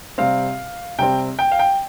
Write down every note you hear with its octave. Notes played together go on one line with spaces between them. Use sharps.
C3 G3 C4 F5
C3 G3 C4 G5
G5
F5
G5